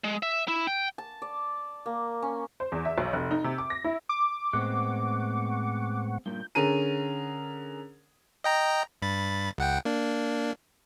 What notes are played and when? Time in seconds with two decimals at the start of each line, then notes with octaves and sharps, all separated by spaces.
0.04 G#3
0.23 E5
0.48 E4
0.67 G5
0.98 A5
1.22 D5
1.86 A#3
2.22 C#4
2.60 C5
2.72 E2
2.85 E5
2.98 B1
3.13 F1
3.31 D#4
3.44 C3
3.58 D6
3.70 A#6
3.84 E4
4.09 D6
4.53 A2 G#3 B3 C4 F#5 C#6
6.26 G2 A#2 G6
6.55 D3 C#4 G#4 A#4 D#7
8.44 D#5 G5 A#5
9.02 G2 B5 A6
9.58 C#2 F#5 G5
9.85 A#3 D4